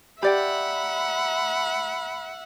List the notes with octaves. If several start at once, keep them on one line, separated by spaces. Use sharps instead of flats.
G4 D5 E5 F#5 G5 B5